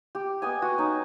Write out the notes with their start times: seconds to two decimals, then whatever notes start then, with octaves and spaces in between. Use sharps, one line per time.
0.15 G4
0.42 B3 D#5 G#5
0.62 F#4
0.78 C#4 D#4